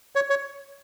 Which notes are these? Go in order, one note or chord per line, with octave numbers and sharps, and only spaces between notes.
C#5
C#5